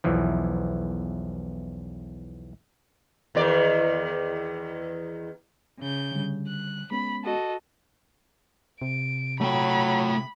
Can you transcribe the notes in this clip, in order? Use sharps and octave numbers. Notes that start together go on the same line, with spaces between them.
B1 E2 E3 F3
E2 D#3 D5
C#3 G6
D3 G3
F#6
G#3 B3 C#4 B5
F#4 A4 D#5
C3 D7
F#3 A3 G5 B5